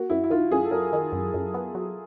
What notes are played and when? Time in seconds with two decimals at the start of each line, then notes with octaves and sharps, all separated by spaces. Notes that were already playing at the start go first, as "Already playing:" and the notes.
Already playing: A#3 F#4
0.10 F#2 E4
0.24 E4
0.30 D#3 F4
0.51 F#2 G#4
0.64 A4
0.71 F#2 A#4
0.93 D#3
1.13 F#2
1.34 F#2
1.54 B3
1.75 F#3